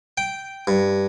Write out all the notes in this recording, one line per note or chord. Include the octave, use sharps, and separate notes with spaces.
G5
G2